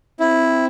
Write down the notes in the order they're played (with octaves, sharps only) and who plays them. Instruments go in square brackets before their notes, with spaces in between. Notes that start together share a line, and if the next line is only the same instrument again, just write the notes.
[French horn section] C4 [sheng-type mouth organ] E4